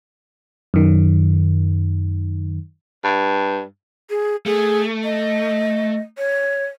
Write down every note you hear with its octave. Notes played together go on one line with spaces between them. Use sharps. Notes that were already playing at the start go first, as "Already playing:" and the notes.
F#2 D#3
G2
G#4
A3 G#4
D#5
C#5